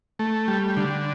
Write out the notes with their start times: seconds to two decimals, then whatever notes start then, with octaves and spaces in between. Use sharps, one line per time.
0.19 A3
0.48 G3
0.77 D3